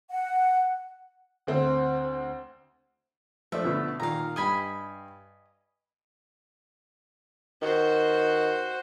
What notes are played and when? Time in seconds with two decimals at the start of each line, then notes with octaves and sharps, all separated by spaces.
0.10 F#5
1.47 D2 C4
3.52 F3 A3 D4 E5
3.64 B2 D3 A3
4.00 A#2 D#3 F5 A#5
4.36 G2 D#5 G#5 B5
7.62 D#3 F#4 C5